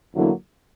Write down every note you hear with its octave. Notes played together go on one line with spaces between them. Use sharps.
E2 D3 F#3 A#3 E4